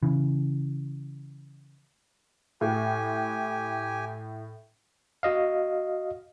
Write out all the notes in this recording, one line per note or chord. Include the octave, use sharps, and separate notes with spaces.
C#3 E3
A2 G4 G#5
F#4 D#5 F5